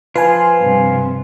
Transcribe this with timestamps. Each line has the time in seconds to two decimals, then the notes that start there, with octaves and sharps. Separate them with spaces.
0.15 F3 F4 B4 G#5
0.60 G2 C3